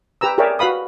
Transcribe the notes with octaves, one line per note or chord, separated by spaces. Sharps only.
G4 B4 A#5 E6
G4 G#4 A#4 C#5 D5 E5
F#4 B4 F5 B5 D#6